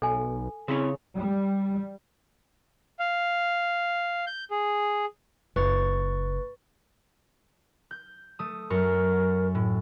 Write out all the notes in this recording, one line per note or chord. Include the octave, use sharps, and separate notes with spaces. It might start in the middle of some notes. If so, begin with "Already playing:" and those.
B1 A4 G#5
C#3 C4 E4 C#5
G3
F5
G6
G#4
F#1 B4 C#6 A6
G6
A3 D#6
F#2 A#4 C#6
A2